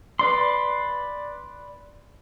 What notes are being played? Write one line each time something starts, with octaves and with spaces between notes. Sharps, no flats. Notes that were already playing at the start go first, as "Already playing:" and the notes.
B4 D5 C6